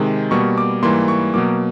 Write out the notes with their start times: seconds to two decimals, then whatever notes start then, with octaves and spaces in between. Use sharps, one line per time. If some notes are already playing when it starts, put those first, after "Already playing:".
Already playing: C3 D#3 G#3
0.31 B2 G3 A#3 C#6
0.58 D6
0.83 G#2 E3 G3 A#3 C6
1.08 C#6
1.33 B2 F#3 A#3 D6